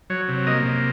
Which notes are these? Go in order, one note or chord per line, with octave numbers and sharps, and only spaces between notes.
F#3 C#5
C3
A#3 D#5
C3